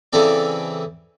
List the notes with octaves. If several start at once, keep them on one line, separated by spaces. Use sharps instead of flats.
C#3 E3 C4 A4 D5